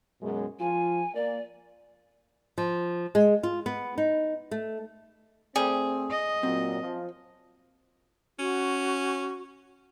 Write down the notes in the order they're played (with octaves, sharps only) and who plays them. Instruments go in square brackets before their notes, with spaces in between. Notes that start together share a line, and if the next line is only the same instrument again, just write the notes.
[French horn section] F#2 B2 G#3
[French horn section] F3 F4 [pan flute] G#5
[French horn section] A#3 [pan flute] D5
[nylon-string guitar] F3
G#3
F4
B3
D#4
A3
[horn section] A3 C4 [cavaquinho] G#4 [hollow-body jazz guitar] D5 G5
[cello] D#5
[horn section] A#2 F#3 [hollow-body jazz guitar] C4
[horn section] F3
[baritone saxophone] C#4 [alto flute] F#4